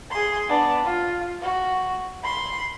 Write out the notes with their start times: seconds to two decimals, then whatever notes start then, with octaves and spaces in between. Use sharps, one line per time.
0.11 G#4 C6
0.49 B3 D4
0.84 F4
1.42 F#4
2.23 B5 C6